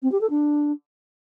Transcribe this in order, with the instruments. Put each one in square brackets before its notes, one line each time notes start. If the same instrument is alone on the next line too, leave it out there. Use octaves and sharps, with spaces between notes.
[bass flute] C4
G4
A4
D4